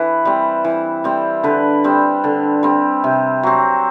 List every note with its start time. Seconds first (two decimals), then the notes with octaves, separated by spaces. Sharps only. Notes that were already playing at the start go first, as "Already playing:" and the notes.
Already playing: E3 B4
0.25 G3 C4
0.64 E3
1.04 G3 C4
1.44 D3 B4
1.84 G3 C4
2.24 D3
2.63 G3 C4
3.04 C3
3.43 F#3 C4